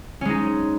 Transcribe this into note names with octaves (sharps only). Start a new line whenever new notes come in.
G#3 C#4 D#4